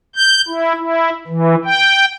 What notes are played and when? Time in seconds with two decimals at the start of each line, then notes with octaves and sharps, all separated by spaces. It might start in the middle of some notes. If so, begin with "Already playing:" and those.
0.16 G6
0.48 E4
0.79 E4
1.27 E3
1.64 G5